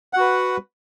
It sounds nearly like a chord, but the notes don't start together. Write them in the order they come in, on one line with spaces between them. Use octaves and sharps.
F#5 F#4 B4